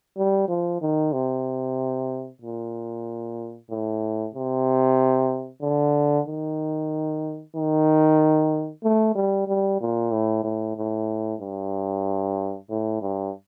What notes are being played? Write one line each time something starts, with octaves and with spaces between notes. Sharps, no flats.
G3
F3
D#3
C3
A#2
A2
C3
D3
D#3
D#3
A3
G3
G3
A#2
A2
A2
A2
G2
A2
G2